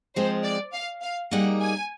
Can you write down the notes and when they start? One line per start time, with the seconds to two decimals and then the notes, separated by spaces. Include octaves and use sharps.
0.16 F3 G#3 C4 F4 C5
0.44 D5
0.74 F5
1.02 F5
1.31 G3 A#3 D#4 G#4 F#5
1.61 G#5